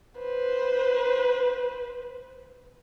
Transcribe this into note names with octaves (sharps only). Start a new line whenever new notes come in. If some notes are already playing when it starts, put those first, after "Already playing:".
B4 C5